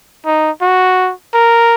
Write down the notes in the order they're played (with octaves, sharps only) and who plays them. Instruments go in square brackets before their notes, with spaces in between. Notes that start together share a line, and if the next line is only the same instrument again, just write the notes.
[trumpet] D#4
F#4
A#4